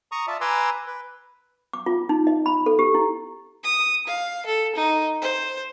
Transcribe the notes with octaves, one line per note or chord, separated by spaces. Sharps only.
A#5 C#6 D#6
F4 D5 E5 A5
B4 G#5 A#5 C6 D6 E6
B4
D6
F4
D#4
D#5
B5
A4
G4
E4
D#6
F5
A4
D#4
C5